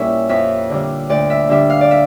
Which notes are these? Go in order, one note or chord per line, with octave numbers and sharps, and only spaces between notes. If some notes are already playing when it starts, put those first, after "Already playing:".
Already playing: A#2 G3 C#4 E4 E5
F2 E5
D3 G3
D2 D5
E5
D3 G3 D4 E5
F5
D5
E5